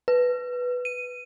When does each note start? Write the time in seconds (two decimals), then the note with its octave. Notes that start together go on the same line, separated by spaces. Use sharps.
0.08 B4
0.85 D#7